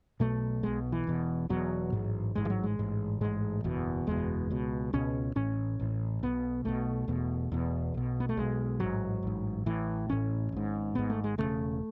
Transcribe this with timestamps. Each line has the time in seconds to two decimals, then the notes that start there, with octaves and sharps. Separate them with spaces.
0.20 B1 B2 A3
0.63 B1 B2 G#3
0.92 E3
1.07 E1 E2 B2
1.49 E1 E2 B2 F#3
1.92 A1 G#2
2.35 A1 G#2 G#3
2.45 E3
2.50 F#3
2.63 G#3
2.79 A1 G#2
3.21 A1 G#2 G#3
3.64 F#1 E2 B2
4.07 F#1 E2 B2 G#3
4.50 C#2 B2
4.93 C#2 B2 C#4
5.36 A1 A2 C#4
5.79 A1 A2
6.23 B1 B2 B3
6.65 B1 B2 A3
7.08 E1 E2 B2
7.51 E1 E2 B2
7.94 B1 B2
8.20 B3
8.29 A3
8.37 B1 B2 G#3
8.80 A1 G#2 F#3
9.23 A1 G#2
9.66 A1 A2 E3
10.09 A1 A2 C#4
10.52 G#1 G#2
10.95 G#1 G#2 B3
11.10 A3
11.24 G#3
11.38 E1 E2 C#3 A3